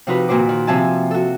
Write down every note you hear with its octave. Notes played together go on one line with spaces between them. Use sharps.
C3 F3 D#4 F#4 B4
A#2 D#3 F#4 C5 D6
D#3
C3 F3 C4 E5 G#5 A5
F#4 A4